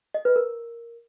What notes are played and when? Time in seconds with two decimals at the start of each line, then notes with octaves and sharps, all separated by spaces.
0.14 D#5
0.25 B4
0.36 A#4